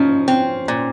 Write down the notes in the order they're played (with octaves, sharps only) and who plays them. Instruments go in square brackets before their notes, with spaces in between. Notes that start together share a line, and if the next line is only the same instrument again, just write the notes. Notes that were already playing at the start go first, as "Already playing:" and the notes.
Already playing: [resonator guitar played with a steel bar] F3 D#4 [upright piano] C#4
[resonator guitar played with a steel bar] C4
A#2